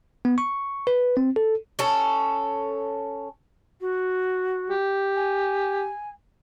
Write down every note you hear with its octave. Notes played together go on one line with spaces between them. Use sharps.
B3
C#6
B4
C4
A4
C#4 A4
F#4
G4
G#5